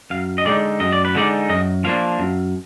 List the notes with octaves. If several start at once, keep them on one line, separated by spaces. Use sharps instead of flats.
F#2 F5
D#5
D3 G#3 D#4 D5
F#2 D#5
D5
B4
D3 G#3 D#4 D5
F#2 D#5
F3 A#3 D4 F5
F#2